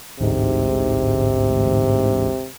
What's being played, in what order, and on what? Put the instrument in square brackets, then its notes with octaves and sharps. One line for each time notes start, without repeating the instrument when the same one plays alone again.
[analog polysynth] A1 D2 G#2 [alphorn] C3